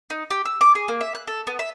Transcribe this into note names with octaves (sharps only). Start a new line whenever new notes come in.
D#4
G4
E6
D6
G#4
A#3
E5
F#6
A4
B3
E5